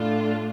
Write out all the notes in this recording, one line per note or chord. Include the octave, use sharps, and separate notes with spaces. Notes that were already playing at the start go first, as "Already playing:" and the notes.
Already playing: A2 A3 D4 F4